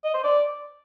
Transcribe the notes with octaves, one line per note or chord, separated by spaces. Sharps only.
D#5
C5
D5